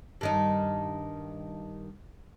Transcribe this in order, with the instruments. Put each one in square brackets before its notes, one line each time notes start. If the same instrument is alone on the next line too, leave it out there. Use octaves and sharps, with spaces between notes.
[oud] G2 D#3 D#4